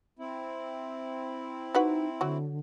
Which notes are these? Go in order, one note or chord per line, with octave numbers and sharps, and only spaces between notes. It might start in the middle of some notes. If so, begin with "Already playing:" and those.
C4 E4
D#4 F#4 B4 F#5
D3 F#3 F#4